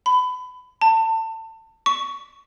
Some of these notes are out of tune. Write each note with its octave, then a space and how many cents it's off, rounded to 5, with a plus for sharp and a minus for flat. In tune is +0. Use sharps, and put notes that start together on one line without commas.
B5 +25
A5 +25
C#6 +10